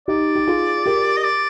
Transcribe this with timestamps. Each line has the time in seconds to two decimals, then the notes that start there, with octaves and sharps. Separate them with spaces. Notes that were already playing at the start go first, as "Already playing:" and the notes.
0.08 D#4 G4 D5
0.35 G4
0.47 F4 G#4
0.86 G4 A#4
1.17 D#5
1.24 D5